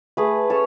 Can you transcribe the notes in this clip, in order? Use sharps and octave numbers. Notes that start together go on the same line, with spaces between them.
A3 G#4 B4
C#4 A4 C#5